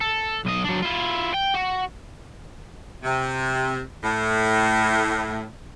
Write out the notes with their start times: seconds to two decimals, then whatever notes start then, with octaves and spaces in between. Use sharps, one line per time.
0.01 A4
0.45 B1 D#5
0.64 F#3 D4
0.82 E4 F4
1.34 G5
1.55 F#4
3.03 C3
4.03 A2